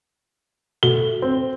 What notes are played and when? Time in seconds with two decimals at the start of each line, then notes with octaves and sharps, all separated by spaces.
0.83 B2 A3 F#4 G7
1.22 C4